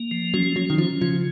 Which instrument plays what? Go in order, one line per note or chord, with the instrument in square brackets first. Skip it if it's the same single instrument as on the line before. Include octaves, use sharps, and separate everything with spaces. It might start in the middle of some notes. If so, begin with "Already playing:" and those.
Already playing: [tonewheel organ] A#3
F3
[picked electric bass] F#3 [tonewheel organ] C#4
[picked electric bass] F#3 [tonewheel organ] C#4
[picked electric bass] D#3
[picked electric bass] F3 [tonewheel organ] C#4
[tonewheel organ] C#3 [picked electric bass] F3